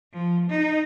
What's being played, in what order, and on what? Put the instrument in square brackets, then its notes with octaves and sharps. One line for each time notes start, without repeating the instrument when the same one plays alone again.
[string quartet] F3
D#4